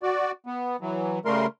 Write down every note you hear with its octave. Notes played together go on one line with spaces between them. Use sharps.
F#4 D5
B3
E3 F#3
C#3 G3 A3 A#4 C6